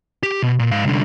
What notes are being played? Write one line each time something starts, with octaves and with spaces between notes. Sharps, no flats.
G4
B2
A#2
G#2 F5
C2 D3